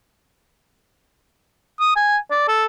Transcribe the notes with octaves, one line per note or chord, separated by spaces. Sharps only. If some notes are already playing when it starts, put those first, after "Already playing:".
D#6
G#5
D5
A4